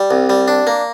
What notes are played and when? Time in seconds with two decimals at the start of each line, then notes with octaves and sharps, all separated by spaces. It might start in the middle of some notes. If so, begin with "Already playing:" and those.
Already playing: G3
0.11 C2
0.30 G3
0.48 D4
0.67 A#3